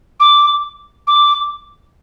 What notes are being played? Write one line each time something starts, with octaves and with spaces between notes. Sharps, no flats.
D6
D6